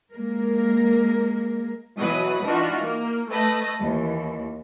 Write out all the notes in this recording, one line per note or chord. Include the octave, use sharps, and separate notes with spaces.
G#3 A#3 A#4
B2 E3 F#3 F#4 B4 D#6
E3 D4 D#4 F4 F#4
A#3
A3 B4 D#5 A5
D#2 E3